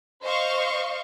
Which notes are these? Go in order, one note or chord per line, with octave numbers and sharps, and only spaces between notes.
C5 D#5 F5 C#6